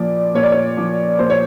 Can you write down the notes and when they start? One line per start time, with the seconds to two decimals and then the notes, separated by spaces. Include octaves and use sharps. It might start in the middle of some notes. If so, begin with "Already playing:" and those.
Already playing: A#2 F3 D5
0.35 A#2 C#5
0.43 D5
0.52 C#5
0.77 F3
1.19 A#2 C5
1.30 C#5